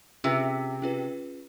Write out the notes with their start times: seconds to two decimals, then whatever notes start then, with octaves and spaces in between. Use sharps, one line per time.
0.24 C3 C#4 F4 G#4 B4
0.82 C#4 F4 G#4 B4